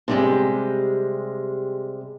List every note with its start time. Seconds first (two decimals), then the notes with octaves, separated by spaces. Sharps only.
0.08 C3 G3 G#3